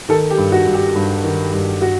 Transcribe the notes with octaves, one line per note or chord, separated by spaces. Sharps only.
D#3 A4
G4
G2
F#4
G2
G4
G2
D#3
G2
F#4